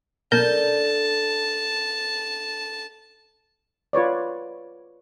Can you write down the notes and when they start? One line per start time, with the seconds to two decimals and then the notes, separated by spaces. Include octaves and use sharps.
0.32 B1 D4 A4 A#4 A5 G6
3.93 F4 B4 C#5 D5